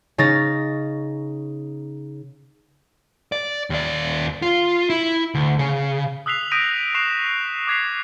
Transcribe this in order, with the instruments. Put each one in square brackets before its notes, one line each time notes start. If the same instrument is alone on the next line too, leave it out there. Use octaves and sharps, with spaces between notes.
[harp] C#3 D#4 C#5 A6 A#6
[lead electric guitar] D5
D#2 D5
F4
E4
D2
C#3
[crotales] D#6 E6 F#6 B6 C7 F7
D#6 G6 A#6 B6 D7 D#7
C#6 F#6 C7 D7 E7 F7
D6 F#6 G#6 B6 C7 F7